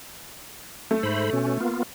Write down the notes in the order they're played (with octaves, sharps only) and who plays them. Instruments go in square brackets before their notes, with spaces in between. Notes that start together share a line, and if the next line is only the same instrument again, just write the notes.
[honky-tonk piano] A3
[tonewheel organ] G#2 C5 B5
B2 C#4
A#3 B3 F4